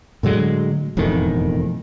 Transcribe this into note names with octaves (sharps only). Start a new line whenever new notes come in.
A2 D3 F#3 G#3
E1 F2 A2 D#3